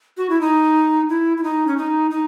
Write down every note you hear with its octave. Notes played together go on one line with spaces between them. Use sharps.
F#4
E4
D#4
E4
E4
D#4
C#4
D#4
D#4